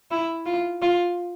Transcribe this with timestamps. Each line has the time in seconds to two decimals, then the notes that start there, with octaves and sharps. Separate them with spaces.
0.11 E4
0.46 F4
0.82 F4